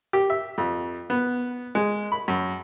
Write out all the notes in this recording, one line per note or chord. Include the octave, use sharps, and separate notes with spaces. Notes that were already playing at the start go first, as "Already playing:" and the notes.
G4
E5
F2
B3
G#3
B5
F#2